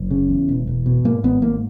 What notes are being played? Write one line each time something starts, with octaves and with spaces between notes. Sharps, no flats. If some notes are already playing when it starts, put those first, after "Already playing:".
Already playing: F#1
C#3
E2
E1
E1
B2
G#2 A#3
G#1 B3
G#2 A#3